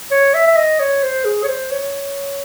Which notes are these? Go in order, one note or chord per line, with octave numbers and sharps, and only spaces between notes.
C#5
E5
E5
D#5
C#5
C5
G#4
C#5
C5
C#5